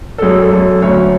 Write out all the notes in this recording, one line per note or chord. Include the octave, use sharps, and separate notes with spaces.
A4
F#2 G#4
A4
F#2
D2 C#5